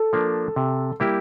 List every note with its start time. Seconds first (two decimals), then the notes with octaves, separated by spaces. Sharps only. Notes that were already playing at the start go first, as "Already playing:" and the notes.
Already playing: A4
0.13 F3 A#3 D4
0.56 C3
1.00 G3 A#3 E4 G4